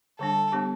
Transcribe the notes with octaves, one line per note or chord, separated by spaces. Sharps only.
D3 G3 D4 A4
G3 B3 D4 G4